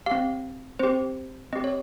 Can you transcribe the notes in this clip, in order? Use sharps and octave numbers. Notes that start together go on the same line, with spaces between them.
C4 G4 F5
C4 G4 C5
C4 G4 D#5
C#5